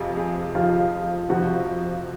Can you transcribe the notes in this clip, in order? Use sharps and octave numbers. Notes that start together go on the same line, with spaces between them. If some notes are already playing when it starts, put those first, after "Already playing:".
Already playing: F2 C3 F3 G#4
G#4
F2 C3 F3 F4
F2 C3 F3 F#4